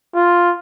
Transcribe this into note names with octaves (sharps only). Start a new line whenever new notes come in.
F4